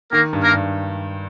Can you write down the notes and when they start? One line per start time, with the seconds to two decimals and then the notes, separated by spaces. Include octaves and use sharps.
0.11 D#3 A#3 A#4
0.33 G2
0.43 A#3 A#4
0.53 G2